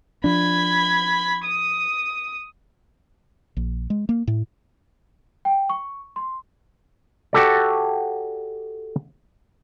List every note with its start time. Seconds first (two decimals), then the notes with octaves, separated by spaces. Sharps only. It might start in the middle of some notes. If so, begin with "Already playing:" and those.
0.24 F3 D4 B5 G#6
1.44 D#6
3.57 A#1
3.90 G#3
4.09 A#3
4.27 A2
5.45 G5
5.69 C#6
6.16 C6
7.33 F#4 G4 A4 D5